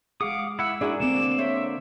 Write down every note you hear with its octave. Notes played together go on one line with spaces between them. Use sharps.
G#3 G#4 F5 F#5 D6 D#6
E4 F#5 E6
D4 E4 F#4 G#4 A#4 D5
D3 A3 A#3 C4 D5 E7
D4 C5 C#5 E5